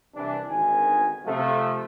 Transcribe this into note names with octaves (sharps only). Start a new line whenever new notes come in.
C2 E3 D4
G#1 D2 D#3 B3 G#5
C3 F3 A3